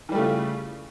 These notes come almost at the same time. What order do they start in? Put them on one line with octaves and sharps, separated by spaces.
E3 G3 A3 C#3 F4